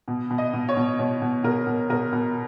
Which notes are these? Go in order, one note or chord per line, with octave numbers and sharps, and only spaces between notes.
B2
B2
D#5
B2
C#5
B2
B2 C#5
B2
B2 A#4
B2
B2 A#4
B2